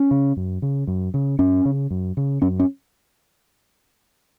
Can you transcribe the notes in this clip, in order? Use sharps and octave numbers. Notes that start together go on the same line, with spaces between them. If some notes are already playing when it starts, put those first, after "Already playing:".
Already playing: C#4
C#3
F#2
C#3
F#2
C#3
F#2 C#4
C#3
F#2
C#3
F#2 C#4
C#4